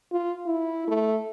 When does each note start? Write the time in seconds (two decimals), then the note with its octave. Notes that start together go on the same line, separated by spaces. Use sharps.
0.12 F4
0.46 E4
0.88 A3